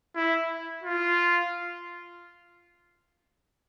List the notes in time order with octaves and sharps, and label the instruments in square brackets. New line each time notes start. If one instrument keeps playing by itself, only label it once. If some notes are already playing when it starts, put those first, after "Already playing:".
[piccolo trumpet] E4
F4